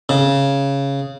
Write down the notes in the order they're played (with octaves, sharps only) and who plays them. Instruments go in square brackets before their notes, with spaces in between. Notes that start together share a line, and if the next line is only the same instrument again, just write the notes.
[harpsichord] C#3